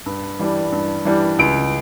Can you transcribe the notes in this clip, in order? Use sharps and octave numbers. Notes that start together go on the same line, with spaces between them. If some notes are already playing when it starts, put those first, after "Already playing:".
G2
E3 G3 D4
G2
E3 G3 D4
C#2 D7